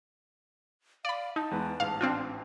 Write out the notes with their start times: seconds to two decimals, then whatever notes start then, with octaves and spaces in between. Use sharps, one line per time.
1.05 D5 F5 B5
1.36 D#4 A5
1.51 E2 G#3 B4
1.80 A1 G#2 F5
2.01 C4 D4 F4